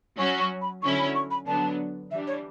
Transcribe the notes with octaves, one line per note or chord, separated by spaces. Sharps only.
F#3 C#4 F#4 C#6
C#6
B5
D3 F#3 C#4 E4 C#6
B5
C#6
B5
D3 F#3 B3 D4 A5
E3 G3 D4 E5
C#5